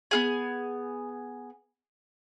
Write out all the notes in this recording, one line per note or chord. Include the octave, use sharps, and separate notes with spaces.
B3 F4 G#4 G#5